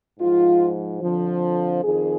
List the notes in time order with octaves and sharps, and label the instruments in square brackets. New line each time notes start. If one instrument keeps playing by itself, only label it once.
[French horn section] G#2 F3 F4
F2 D3 F3
F2 D#3 G#4